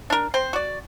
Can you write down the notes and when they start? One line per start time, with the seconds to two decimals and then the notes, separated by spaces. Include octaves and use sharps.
0.10 D4 A#4
0.34 C4 C5
0.53 F#4 D5